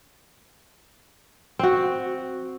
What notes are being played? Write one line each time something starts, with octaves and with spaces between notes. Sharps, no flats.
C4 F#4